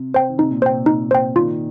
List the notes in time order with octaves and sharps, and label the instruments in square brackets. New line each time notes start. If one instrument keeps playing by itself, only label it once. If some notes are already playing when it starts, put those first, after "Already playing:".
Already playing: [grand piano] C3
[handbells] C5 G5
[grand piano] D#3
[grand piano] C3 [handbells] D#4
[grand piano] A#2
[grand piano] C3 [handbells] C5 G5
[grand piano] A#2
[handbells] D#4
C5 G5
[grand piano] A#2 D#3 [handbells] F4